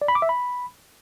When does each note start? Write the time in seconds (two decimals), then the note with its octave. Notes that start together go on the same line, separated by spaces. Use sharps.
0.02 D5
0.08 B5
0.15 D6
0.22 E5
0.29 B5